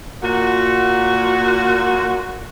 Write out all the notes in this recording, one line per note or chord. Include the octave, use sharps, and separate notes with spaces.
A#2 F#4